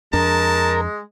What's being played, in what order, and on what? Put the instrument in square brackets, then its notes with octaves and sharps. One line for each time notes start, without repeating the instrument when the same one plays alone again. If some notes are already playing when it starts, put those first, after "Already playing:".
[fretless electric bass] F2 D4 [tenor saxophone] G#3 [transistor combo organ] A#4 [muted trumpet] A5